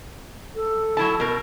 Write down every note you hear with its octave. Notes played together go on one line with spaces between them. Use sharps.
A4
F#3 E4 A5
B2 A#4